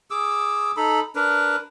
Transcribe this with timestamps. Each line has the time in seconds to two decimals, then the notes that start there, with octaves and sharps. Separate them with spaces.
0.11 G#4 D6 E6
0.77 D#4 A4 B5
1.15 D4 A#4 B4